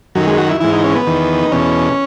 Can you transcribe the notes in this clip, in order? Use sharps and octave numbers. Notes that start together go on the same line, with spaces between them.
F#2 D#3 F#3
G#3
F#4
E4
G#2 E3 E4
D#4
C#4
B3
E2 D#3
D#4
E2 B2 C#4